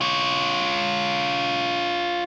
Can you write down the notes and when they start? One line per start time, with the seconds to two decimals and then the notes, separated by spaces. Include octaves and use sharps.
0.01 F4 C#5